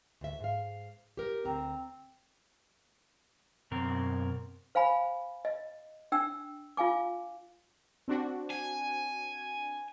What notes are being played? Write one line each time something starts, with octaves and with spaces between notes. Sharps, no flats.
D2 E5
G#2 F5
G4 A#4
D2 C4 A#5
F#2 B2 C4 A#4
C5 F5 G#5 B5
D#5
D4 G5 E6
F4 F5 G#5 D6
C4 D4 F#4
G#5